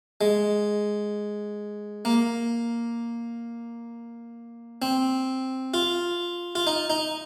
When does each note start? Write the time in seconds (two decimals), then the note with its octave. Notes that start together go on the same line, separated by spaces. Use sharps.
0.21 G#3
2.05 A#3
4.82 C4
5.74 F4
6.55 F4
6.67 D#4
6.90 D#4